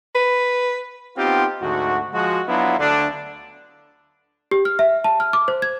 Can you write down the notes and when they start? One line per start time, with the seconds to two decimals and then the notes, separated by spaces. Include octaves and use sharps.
0.15 B4
1.17 B3 C4 D#4 F4 G4
1.61 D2 G#2 F#4
2.13 F3 G#3 F#4
2.48 F#3 B3 D4 E4 F4
2.79 D2 D3 D4
4.51 G4
4.65 F6
4.79 E5
5.04 A5
5.20 F6
5.33 D6
5.48 C5
5.62 G#6